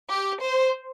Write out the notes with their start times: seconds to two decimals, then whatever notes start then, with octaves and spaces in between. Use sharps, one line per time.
0.11 G4
0.42 C5